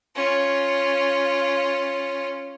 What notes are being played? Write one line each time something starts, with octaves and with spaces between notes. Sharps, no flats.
C#4 F4